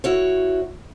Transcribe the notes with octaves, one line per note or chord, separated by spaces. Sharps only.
E4 F#4 C#5